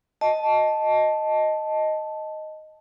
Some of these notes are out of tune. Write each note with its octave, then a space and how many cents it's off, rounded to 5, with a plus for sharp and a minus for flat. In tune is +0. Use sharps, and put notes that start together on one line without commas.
D#5 +0 A5 -5